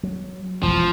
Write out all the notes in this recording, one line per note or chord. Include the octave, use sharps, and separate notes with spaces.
F#3
E1 A1 F3